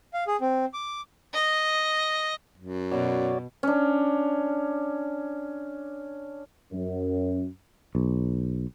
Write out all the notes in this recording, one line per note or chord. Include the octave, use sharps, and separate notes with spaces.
F5
G#4
C4
D6
D#5
F#2
B2 F#4 C#5 D5
C#4 D4
F#2
B1